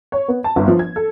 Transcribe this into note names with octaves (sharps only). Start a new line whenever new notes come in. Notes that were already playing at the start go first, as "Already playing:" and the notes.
C#5
B3
A5
G1
F3
G#6
A4